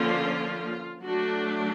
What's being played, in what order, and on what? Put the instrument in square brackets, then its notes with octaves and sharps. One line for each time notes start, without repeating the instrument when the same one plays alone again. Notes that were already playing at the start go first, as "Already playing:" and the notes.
Already playing: [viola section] D3 F3 A#3 C#4 F4
F#3 A3 D4 F#4